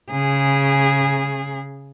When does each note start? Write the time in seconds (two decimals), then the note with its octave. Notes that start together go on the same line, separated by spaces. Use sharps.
0.11 C#3 G#4